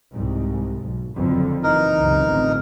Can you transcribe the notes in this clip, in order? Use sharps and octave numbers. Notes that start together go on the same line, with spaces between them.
C2 G#2
B1
F#1 F2 D3
F#1 E3 D#4 A#4
C#2 F#2 C3
A1 F2 D3